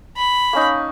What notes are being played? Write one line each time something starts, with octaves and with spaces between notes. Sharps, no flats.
B5
A#3 C#4 D#4